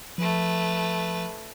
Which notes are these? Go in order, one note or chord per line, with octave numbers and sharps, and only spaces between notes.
F3 A3 B4